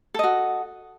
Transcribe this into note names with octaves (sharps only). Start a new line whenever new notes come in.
F#4 A4 D#5